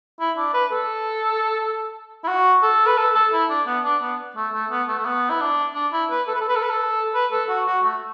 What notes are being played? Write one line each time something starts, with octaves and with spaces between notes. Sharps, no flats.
E4
D4
B4
A4
E4
F#4
A4
B4
A4
A4
E4
D4
B3
D4
B3
A3
A3
B3
A3
A3
B3
E4
D4
D4
E4
B4
A4
B4
A4
B4
A4
B4
A4
B4
A4
F#4
F#4
A3